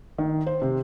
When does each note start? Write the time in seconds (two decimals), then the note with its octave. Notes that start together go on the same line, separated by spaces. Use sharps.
0.18 D#3
0.47 C5
0.62 C3